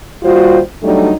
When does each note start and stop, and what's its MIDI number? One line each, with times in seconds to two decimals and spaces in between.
0.23 0.60 39
0.23 0.60 55
0.23 0.60 65
0.23 0.60 66
0.23 0.60 72
0.83 1.11 54
0.83 1.11 55
0.83 1.11 57
0.83 1.11 62
0.83 1.11 63